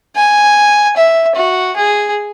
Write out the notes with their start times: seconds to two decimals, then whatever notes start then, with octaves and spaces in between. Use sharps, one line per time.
0.16 G#5
0.97 E5
1.35 F#4
1.76 G#4